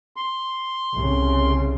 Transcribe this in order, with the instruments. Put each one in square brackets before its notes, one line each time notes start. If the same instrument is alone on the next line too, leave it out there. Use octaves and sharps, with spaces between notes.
[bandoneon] C6
[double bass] C2 C#3